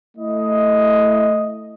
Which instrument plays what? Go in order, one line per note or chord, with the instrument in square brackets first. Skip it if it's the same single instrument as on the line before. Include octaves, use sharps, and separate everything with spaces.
[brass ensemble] A3 E4 D#5